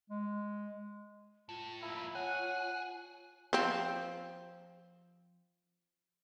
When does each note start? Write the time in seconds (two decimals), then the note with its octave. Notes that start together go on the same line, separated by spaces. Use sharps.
0.10 G#3
1.49 A2 F4
1.82 F2 A#3 E4
2.15 G#4 C#5 F#5 F#6
3.53 F3 C4